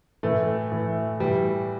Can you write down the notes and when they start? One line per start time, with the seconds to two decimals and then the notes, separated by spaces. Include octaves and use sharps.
0.23 A2 E3 A3
0.72 A2 E3
1.20 A2 E3 G3